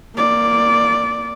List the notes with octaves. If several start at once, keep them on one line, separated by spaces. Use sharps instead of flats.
A#3 D5